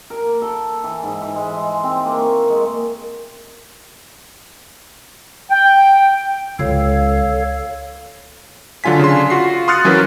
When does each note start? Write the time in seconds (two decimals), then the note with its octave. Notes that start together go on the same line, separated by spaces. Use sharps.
0.10 A#4
0.25 A#3
0.42 A4
0.84 E3
1.03 G#2
1.21 E3
1.36 G#3
1.56 G#3
1.84 C4
2.06 A#3
2.21 C#6
2.49 G#3
5.51 G5
6.59 C#2 A4 C#5 F5
8.84 D3 F#3 F4 G#5 B6
8.99 C#3 D4 C6
9.30 F4 F#4 C7
9.68 C6 D#6 F6 F#6 A6 C#7
9.84 E3 F#3 C#4 A#4 B4